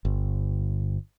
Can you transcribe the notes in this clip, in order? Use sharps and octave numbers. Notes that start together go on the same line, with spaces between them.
G1